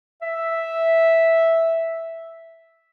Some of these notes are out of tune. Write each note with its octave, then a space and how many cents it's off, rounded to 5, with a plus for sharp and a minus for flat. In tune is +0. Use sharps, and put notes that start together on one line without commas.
E5 -5